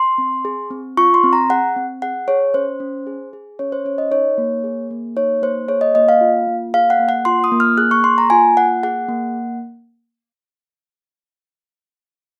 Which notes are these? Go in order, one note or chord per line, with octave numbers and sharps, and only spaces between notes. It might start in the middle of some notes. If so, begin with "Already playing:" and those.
Already playing: C6
C4
G#4
C4
F4 C#6
C6
C4
A#5
G#4 F#5
C4
G#4 F#5
G#4 C#5
C#4 C5
C#4
G#4
G#4
C#4 C#5
C5
C#4 C#5
D#5
D#4 C#5
A#3
G#4
A#3
D#4 C#5
A#3 C5
G#4 C#5
D#5
A#3 D#5
F5
F4
A#3
G#4 F5
F#5
A#3
F#5
F4 C6
D#6
A#3
F6
G#4 F#6
C#6
A#3 C6
A#5
F4 G#5
A#3 F#5
G#4 F#5
A#3